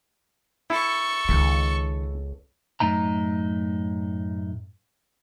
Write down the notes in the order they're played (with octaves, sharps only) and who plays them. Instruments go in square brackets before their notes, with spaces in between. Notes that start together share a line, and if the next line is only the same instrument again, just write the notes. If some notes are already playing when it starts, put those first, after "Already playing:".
[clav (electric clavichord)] E4 [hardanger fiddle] A4 C#6
[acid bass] C#2 [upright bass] D#3
[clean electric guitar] F#2 A2 D#4 A#5